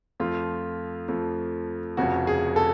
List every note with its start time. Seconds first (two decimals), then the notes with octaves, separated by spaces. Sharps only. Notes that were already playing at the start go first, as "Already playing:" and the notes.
0.20 F2 F3 A3 F4
1.08 F2 F3 A3
1.97 F1 F2 C#3 F#4
2.27 G#4
2.56 A4